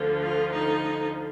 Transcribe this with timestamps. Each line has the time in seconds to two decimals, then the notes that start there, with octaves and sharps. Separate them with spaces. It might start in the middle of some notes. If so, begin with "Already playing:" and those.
Already playing: D2 D3 F3
0.23 F4
0.52 D#4